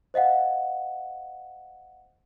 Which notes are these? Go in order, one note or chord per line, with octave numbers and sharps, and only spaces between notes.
C5 D#5 F5 F#5